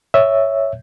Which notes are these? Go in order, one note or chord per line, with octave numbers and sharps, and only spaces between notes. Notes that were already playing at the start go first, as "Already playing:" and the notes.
C#5 E5